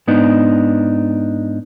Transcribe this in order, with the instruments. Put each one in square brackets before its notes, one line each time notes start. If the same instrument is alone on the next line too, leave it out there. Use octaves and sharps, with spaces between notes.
[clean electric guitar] G#2 B3 D4 D#4